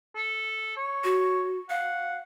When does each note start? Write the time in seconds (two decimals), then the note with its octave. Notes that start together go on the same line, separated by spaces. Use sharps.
0.16 A4
0.77 C#5
1.04 F#4
1.70 F5 F#5